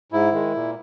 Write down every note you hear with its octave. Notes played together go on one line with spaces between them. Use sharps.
G#2 E4
D#3 G#3
A#2